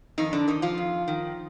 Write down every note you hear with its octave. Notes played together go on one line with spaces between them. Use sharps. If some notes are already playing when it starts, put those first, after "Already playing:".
F2 D#3 D#4
D3 D4
C3 D#3 D#4
F3 F4
F2
D#3